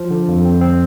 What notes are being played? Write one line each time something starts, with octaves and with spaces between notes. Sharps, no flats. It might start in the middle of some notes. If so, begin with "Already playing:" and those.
Already playing: F3
D3
F2
C4
C4